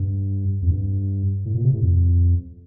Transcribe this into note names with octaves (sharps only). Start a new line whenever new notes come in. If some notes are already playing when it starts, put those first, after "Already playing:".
Already playing: G2
F2
G2
A2
A#2
C3
A2
F2